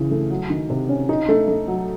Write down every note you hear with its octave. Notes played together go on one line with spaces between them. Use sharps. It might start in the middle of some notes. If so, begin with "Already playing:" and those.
Already playing: C#3 E3
A3
F#3
D#3
C3
C#4
D#4
A3
A3
F#3